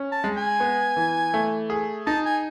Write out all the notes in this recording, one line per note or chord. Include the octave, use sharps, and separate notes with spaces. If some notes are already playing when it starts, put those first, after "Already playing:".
Already playing: C#4
A5
G#3
G#5
B3
E3
A3
G#4
D#4 A5
G#5